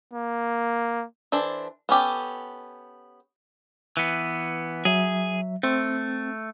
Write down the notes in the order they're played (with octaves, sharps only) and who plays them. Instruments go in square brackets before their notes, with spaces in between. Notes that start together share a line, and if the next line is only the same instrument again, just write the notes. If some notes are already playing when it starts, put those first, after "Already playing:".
[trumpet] A#3
[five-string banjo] E3 D4 A4 C5
B3 C#4 G4 A4
[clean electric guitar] E3 B3
[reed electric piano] F#3 E5 [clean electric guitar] G#4
[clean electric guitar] A3 [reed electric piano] C4